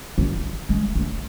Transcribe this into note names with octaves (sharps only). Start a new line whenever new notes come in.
E3
G#3
A3